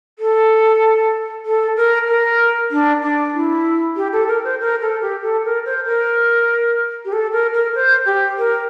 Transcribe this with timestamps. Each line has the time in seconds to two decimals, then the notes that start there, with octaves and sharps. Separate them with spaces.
0.19 A4
1.46 A4
1.77 A#4
2.08 A#4
2.71 D4
3.02 D4
3.34 E4
3.96 G4
4.13 A4
4.28 A#4
4.44 C5
4.61 A#4
4.81 A4
5.01 G4
5.22 A4
5.45 A#4
5.66 C5
5.85 A#4
7.05 G4
7.13 A4
7.32 A#4
7.53 A#4
7.75 C5
8.06 G4
8.38 A#4